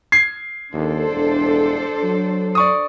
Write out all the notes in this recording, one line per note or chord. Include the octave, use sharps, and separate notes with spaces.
G#6 C7
D#2 D4 A4 C5
E1
F#3
D5 C#6 D#6